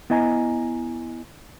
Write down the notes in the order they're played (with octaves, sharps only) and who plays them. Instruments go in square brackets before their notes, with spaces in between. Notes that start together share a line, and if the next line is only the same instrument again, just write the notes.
[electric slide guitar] B3 E4 D#5 G#5 A#5